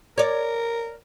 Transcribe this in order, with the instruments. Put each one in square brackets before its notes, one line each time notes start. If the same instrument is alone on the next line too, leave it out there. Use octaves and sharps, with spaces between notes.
[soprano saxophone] A#4 [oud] C#5 D5